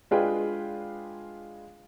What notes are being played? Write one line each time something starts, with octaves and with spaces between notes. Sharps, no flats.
G#3 D4 F4 G#4 B4 G5